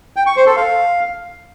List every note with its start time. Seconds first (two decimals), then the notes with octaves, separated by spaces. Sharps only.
0.16 G5
0.26 C#6
0.36 C5
0.46 A4
0.56 F5